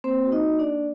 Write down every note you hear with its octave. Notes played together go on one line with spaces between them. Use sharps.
A#3 C4 C5
F#4
D#4 D#5
A#3
D4 D5
A#3